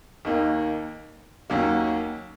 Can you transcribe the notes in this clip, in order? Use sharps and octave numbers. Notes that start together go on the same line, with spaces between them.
D#2 D#3 A#3 D#4
D#2 D#3 F#3 A#3 C#4